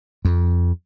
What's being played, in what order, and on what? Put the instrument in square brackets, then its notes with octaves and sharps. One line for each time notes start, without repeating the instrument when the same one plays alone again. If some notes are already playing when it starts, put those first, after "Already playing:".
[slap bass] F2